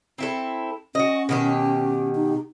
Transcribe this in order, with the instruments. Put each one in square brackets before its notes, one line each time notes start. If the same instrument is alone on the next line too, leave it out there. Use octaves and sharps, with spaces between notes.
[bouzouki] C4 E4 A4
[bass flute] C#4 [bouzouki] F#4 D#5
[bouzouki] B2 D#3 G4
[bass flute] D#4